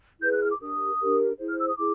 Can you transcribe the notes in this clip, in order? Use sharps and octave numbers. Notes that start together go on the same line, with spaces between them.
E4 G#4 B4 G6
F#6
F6
D6
D4 G4 A#4 D#6
D4 G4 A#4
E4 G#4 C5
F6
E6
D#6
E4 G#4 D6